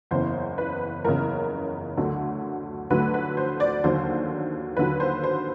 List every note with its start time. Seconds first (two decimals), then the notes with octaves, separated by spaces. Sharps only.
0.11 F#1 E2 C#3 C5
0.58 B4
1.04 F#1 E2 C#3 A#4
1.97 D2 D3 F#3 A3
2.90 D2 D3 F#3 A3 B4
3.14 B4
3.37 C5
3.60 D5
3.84 D#2 D3 F#3 C5
4.77 D#2 D3 F#3 B4
5.00 C5
5.23 C5